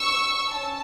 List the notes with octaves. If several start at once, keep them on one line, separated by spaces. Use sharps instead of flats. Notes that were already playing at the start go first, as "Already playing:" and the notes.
Already playing: C#6 E6
C#4 A5